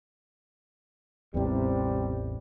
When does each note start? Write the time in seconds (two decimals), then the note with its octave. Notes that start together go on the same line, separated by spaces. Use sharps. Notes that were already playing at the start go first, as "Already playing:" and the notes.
1.34 A1 E2 C3 G3